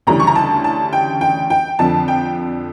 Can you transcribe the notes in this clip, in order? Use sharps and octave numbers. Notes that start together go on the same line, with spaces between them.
D2 C#3 E3 G3 A#5
C#6
A#5
A5
A5
G5
G5
G5
F2 D3 F3 A5
G5